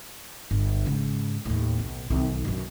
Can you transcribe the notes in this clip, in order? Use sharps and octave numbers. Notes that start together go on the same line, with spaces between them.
G1
G#2 C#3
D#2 A2
B1
B1 D#3
F#2 B2